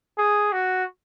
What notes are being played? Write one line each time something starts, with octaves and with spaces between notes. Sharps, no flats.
G#4
F#4